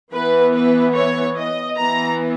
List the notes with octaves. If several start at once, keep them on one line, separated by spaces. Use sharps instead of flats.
E3 B3 B4
B4
C#5
D#5
E3 B3 A#5